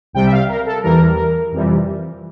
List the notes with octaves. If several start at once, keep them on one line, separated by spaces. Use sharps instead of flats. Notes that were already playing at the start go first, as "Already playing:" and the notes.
C2 C3 G3 G5
E5
F5
A#4
A4
E2 E3 G3 A#4
F2 C3 E3 G3